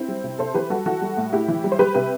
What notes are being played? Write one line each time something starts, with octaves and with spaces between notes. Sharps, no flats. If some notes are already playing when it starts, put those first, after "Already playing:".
Already playing: C4 E4
G3
C3
C3 A4 C5
E3 G4 B4
G3 F#4 A4
E3 F#4 A4
G3
A2
A2 E4 G4
E3
G3
C5
G3 G4 B4
C3 G4 B4